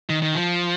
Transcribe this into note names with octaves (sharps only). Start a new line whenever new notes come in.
D#3
D#3
F3